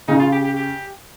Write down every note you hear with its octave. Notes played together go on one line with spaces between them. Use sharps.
C#3 D#4
F4
G4
G4
G4